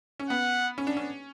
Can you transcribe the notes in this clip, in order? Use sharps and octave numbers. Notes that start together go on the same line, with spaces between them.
C#4
B3 F#5
C#4
D4
C#4